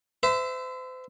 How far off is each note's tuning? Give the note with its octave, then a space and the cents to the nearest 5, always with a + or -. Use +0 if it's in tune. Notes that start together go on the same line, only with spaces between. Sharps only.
C5 -40 E5 +0